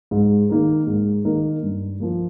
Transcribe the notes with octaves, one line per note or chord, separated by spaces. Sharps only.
G#2
D#3 A#3 D#4 A#4
G#2
D#3 A#3 D#4 A#4
G2
F3 A#3